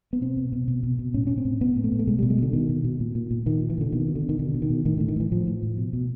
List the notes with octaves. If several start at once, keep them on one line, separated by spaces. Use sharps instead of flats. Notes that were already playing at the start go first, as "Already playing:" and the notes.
B3
B2 C4
B2
B2
B2
B2
B2
A2 C#4
A2 C#4
C4
A2
A2 B3
A2
A3
A2
A3
B2 G#3
B2 G3
G#3
B2 D3
B2 D#3
B2
B2
A#2
A#2
A#2
A#2 D#3
A#2
E3
A#2 D3
B2 D#3
B2
D3
B2
D#3
B2 D3
B2
D#3
B2
A2 D#3
A2 D3
D#3
A2 E3
A2 F3
A2
A2
B2
B2